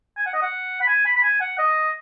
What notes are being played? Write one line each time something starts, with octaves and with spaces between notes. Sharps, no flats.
G#5
F#5
D#5
F#5
B5
G#5
B5
B5
G#5
F#5
D#5